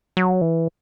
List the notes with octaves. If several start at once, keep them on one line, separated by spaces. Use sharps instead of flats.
F#3
E3